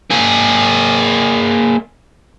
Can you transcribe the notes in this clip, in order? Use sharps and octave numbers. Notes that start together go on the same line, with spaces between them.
A#3 G#4